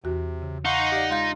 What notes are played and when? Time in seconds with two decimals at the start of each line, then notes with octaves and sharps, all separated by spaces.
0.04 E2 C3 E3 F#4
0.42 C#3
0.65 D#4 F5 F#5 C6 C#6
0.92 G4 D5 F5 D6
1.10 G#3 F4 F5 G6